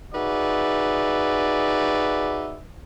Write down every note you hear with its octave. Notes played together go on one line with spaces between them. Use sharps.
D#4 F#4 G#4 B4 D5 E5